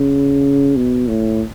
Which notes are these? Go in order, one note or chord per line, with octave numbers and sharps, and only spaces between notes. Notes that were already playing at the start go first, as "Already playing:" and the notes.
Already playing: C#3
B2
A2